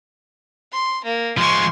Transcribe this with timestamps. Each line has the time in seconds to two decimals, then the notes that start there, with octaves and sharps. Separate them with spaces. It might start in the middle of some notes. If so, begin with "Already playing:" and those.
0.72 C6
1.04 A#3
1.38 F3 G#3 C6 C#6